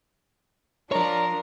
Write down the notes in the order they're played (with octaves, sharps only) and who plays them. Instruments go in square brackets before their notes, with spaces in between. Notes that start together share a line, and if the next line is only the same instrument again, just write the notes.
[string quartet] F3 D4 [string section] A#4 [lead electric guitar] C#5 D5